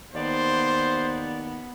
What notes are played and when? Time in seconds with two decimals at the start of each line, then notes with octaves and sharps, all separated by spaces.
0.14 D#2 B3 C5 D5